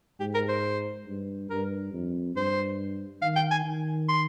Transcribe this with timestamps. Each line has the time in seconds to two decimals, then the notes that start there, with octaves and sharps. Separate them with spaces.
0.20 G#2 G4
0.34 A#4
0.49 C5
1.06 G2
1.50 G2 A#4
1.93 F2
2.35 G2 C5
3.22 D#3 F5
3.36 G5
3.51 G#5
3.65 D#3
4.09 C6